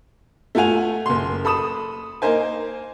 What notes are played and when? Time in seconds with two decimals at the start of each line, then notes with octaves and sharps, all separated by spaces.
0.55 A3 F4 F#5 G#5 F7
1.06 F#1 C6
1.45 A4 B5 D#6 E7
2.22 A#3 D#4 A#4 C5 G#5